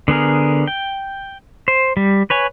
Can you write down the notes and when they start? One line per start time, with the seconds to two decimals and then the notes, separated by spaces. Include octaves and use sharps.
0.08 D3 B3 G#4 A#4
0.67 G5
1.68 C5
1.97 G3
2.30 B4 C#5 G#5